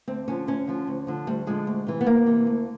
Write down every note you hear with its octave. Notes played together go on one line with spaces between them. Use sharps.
D2 C4
D3 F3 C#4
D2 C#4
D3 F3
D2
D3 F3
D2 G3
D3 F3 G#3
D2
C3 E3
B3
D2 A#3
C3 E3
D2